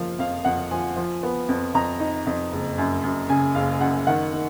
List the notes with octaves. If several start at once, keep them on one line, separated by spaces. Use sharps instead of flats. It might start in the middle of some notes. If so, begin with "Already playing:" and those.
Already playing: F#1 F3 A#3 F5
F2 F5
F2 F#5
F3 G#5
F3
B3
F2
F2 A#5
D#4
F2
F#1
F#2
F#2
C#3 G#5
F#1 F5
F#2 F#5
D#3 F#5
D#3